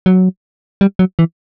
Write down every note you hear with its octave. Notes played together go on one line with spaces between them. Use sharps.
F#3
G3
F#3
E3